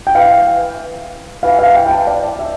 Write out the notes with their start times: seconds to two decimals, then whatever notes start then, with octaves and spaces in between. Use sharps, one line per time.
0.07 G5
0.15 E3 F5
1.43 E3 F5
1.59 F5
1.75 G5
1.86 G5
1.91 A5
2.07 D5
2.39 E5